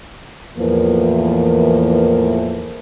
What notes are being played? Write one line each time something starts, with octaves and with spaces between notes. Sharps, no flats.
E2 A2 E3 F3 A#3 A#4